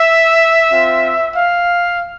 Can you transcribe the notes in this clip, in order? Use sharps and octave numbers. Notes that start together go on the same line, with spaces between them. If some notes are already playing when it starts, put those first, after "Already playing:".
Already playing: E5
C4 F4
F5